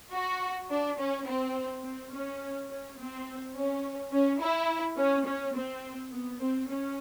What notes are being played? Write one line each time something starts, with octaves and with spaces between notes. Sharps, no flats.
F#4
D4
C#4
C4
C4
C#4
C#4
C4
C#4
C#4
E4
C#4
C#4
C4
B3
C4
C#4